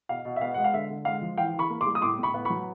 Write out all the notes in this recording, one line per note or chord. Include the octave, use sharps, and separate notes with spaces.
B2 F5
B2
E5
B3 F5
G#3 F#5
F5
D3 E5
D3
G#3 F5
F3
E3 F5 G5
E3
B5 C#6
A#3
C6 D6
G3
D#6
A2 C6 D6
A2 B5 C#6
B3
B5 C#6
F#3